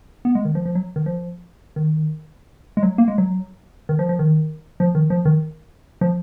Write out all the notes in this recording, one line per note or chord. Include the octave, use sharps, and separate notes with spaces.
B3
G#3
D#3
F3
F3
F#3
D#3
F3
D#3
G#3
F#3
A#3
G#3
F#3
D#3
F3
F3
D#3
F3
D#3
F3
D#3
F3